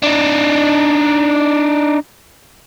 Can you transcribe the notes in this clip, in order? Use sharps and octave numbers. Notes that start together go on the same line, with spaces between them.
D4 D#4